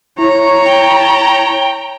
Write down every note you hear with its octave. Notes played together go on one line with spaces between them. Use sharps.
E4 C#5 A#5
G5